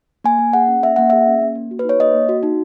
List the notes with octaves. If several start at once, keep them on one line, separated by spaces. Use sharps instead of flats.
A#3 G#5
A#3
G#4 F#5
C#4
A#3 E5
A#3 F#5
G#4 E5
C#4
A#3
A#3
F#4
B4
D#4 C#5
A#3 D#5
A#3
F#4
D#4